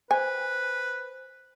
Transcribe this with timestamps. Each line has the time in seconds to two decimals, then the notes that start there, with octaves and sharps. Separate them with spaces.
0.11 B4 C5 G#5